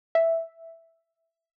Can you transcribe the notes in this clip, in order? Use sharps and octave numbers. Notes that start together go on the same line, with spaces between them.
E5